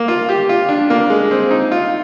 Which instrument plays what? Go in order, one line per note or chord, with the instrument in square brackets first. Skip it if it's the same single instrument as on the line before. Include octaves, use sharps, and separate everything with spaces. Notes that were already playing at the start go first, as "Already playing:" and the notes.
Already playing: [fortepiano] A#3
F4
G4
F4
D4
A#3
G#3
C4
D#4
F4